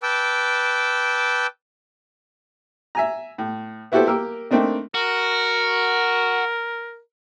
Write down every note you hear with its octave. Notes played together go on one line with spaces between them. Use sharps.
B4 G5 A5 D6 E6
E5 G#5 A#5
A2
B3 E4 F#4 G4 A4 C5
A#3 G4 A#4 E6
A3 A#3 C4 D4 D#4
F#4 A#4